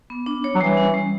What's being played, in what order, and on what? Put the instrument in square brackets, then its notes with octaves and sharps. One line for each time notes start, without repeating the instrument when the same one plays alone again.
[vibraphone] B3
D4
C#5
[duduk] F#3
[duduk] E3 [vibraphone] G3
[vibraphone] C#4
G3